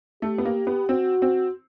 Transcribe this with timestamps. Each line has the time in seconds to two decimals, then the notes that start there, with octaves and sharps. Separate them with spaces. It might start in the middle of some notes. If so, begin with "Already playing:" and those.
0.22 A3 G4
0.38 B3
0.45 A#3
0.67 B3
0.89 C4 F#4
1.22 C4